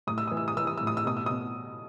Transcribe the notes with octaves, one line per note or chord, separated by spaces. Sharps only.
A2 D#6
E6
E3 D#6
E6
D#6
E3 E6
D#6
A2 E6
D#6
E6
B2 D#6
E6
B2 D#6